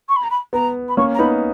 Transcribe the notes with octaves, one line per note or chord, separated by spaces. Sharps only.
C#6
B5
A#5
B5
B3 A#5
B5
A#3 C#4 C#6
A#5
B3 D#4 B5